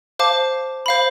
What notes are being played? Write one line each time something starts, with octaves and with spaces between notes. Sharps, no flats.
C5 F5 A5 D6
C5 F5 B5